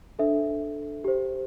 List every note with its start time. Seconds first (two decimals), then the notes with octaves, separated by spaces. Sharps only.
0.19 D4 A4 C5 E5
1.04 G4 C5